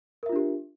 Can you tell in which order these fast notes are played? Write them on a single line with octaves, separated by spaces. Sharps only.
A#4 E5 F4 D4 G4